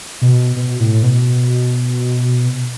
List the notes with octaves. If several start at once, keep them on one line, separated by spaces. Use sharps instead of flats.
B2
B2
A2
B2